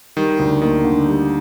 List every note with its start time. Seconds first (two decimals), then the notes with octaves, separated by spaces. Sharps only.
0.17 D#3 G3
0.39 D2
0.61 D#3 A#3
0.84 D3
1.07 G3